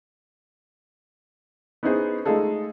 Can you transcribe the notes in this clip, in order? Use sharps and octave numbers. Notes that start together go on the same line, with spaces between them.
B3 C#4 D#4 E4 G#4 C5
G#3 A3 D#4 F4 G#4 A4